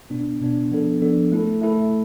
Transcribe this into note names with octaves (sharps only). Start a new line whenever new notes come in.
B2 B3 D4
B2 B3 D4
F3 B3 D4 A4
F3 B3 D4 A4
A3 E4 A4
A3 E4 A4